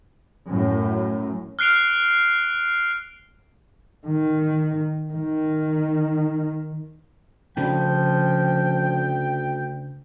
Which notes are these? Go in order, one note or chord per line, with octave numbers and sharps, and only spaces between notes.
F#2 A2
F6 F#6 C7 D7 F7
D#3
D#3
D2 C#3 F3 C#4 G5